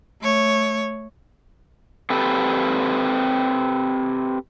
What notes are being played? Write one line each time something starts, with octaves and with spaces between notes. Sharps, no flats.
A3 C#5
C4 G4 A4 B4